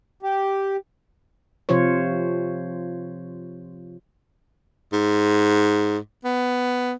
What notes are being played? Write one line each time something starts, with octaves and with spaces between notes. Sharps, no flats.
G4
C3 F3 F4 C5 C#5
G#2
B3